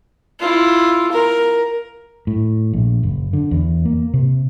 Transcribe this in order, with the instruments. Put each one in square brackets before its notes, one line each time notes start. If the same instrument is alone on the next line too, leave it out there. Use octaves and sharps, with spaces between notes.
[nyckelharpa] E4 F4
A#4
[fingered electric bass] A2
A#1
F#1
D3
E2
A#3
C3